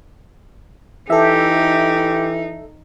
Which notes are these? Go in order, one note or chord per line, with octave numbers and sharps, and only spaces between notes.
E3 D#4 G4 A4 E5